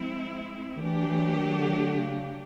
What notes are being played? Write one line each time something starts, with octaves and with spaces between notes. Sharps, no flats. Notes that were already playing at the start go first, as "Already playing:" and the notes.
Already playing: F3 G#3 C4 E4
D#3
E3 F#3 A3 D4 G4
E3
D#3
D3
D#3
D3
C#3